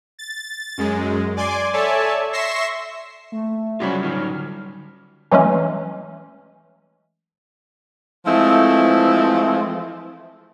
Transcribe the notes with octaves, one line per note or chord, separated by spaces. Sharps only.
A6
F#2 G#3
D5 G#5 C6 D6
A4 C#5 D5 E5 G#5 A5
E5 C6 C#6 A#6 C7 E7
A3
F#3 G3 C#4 F4 C5 F#5
D3 D#4 F4 F6
E3 F#3 G#3 A3 C#4
E3 F3 G#3 A3 C4 E4